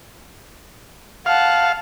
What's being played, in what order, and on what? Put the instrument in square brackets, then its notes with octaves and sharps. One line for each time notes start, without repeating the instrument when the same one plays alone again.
[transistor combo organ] F5 [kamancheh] F#5 A5